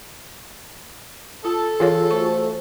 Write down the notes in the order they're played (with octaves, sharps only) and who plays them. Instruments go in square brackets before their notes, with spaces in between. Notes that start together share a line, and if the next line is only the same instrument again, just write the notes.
[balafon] F4 [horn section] A4
[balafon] E3 A#4 C#5 [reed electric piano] F4 G#4
[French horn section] A3 F#4 C5 [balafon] C#6